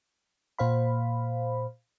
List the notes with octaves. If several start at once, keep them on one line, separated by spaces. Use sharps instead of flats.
A#2 C5 F5 B5